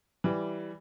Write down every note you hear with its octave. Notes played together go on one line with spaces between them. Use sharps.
E3 G3